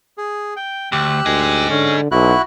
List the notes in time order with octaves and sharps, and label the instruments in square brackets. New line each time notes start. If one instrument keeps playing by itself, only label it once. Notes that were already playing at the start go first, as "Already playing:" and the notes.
[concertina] G#4
G5
[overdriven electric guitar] D2 [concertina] G4 E6 F#6
[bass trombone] D2 [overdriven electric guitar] D#4 G#4
[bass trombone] D3 [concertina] C#4
[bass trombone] B1 [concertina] E4 F#4 F#6